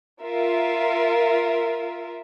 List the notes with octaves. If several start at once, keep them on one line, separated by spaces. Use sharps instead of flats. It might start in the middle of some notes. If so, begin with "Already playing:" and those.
F4 A#4 E5